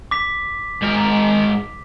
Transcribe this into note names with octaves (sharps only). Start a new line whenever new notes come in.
D6 B6
G#2 A#4